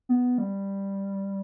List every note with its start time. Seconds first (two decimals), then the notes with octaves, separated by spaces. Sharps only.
0.09 B3
0.38 G3